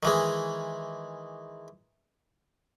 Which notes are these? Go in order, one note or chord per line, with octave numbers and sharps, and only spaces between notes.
D#3 E3 G#3